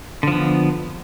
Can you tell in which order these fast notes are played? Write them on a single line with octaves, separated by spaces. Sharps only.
D3 F3 B3